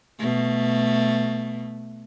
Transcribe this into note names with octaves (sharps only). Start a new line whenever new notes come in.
B2 A3